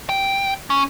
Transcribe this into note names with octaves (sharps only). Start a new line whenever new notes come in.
G5
C#4